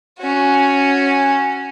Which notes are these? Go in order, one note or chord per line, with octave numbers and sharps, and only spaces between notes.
C#4 F#4